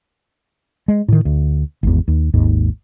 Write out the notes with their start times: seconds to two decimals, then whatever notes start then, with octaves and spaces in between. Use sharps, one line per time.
0.88 G#3
1.08 A2 D#3
1.25 D2
1.83 G#1 E2
2.08 D#2
2.34 G#1 D#2 G#2